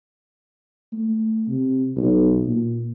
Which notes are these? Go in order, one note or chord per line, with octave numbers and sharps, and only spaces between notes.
A3
C3
B1
A#2